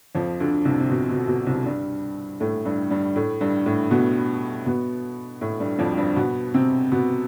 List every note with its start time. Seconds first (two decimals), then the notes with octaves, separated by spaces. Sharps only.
0.15 F2 F3
0.40 D2 D3
0.65 C2 C3
0.81 C3
0.90 B2
1.09 B2
1.28 B2
1.46 C2 C3
1.65 G2 G3
2.40 A2 A3
2.65 G2 G3
2.90 G2 G3
3.15 A2 A3
3.41 G2 G3
3.66 A2 A3
3.91 B2 B3
4.66 B2 B3
5.41 A2 A3
5.60 G2 G3
5.79 F2 F3
5.97 G2 G3
6.16 B2 B3
6.54 C3 C4
6.92 B2 B3